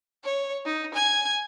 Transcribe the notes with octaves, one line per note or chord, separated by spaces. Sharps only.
C#5
D#4
G#5 G#6